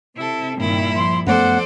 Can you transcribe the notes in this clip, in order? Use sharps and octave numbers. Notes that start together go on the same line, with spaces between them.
C3 E4 A4
G2 A#2 D#3 G3 E4
F3 C6
F#2 A3 B3 A4 C5 D5 F#5